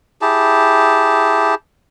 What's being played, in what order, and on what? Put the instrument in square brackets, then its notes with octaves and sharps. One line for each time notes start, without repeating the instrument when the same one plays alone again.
[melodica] E4 G4 G#4 A5